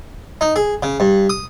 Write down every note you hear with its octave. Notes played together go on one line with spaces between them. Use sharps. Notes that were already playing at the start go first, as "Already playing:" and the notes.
D#4
G#4
C#3
G2
D#6